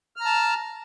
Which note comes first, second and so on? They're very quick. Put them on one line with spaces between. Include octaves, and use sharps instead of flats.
F6 A#5 A5